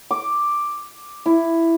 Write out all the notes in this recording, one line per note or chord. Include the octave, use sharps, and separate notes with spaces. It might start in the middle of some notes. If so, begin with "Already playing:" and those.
D6
E4